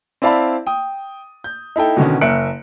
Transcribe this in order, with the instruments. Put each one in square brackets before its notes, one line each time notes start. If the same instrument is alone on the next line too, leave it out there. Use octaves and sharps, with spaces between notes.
[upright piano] C4 E4 D5 F5 A5 B5
G5 D#6
G6
D#4 E4 A4 G5
B2 D3 D#3 C#4
F#1 A#4 E5 F#6 C#7 D7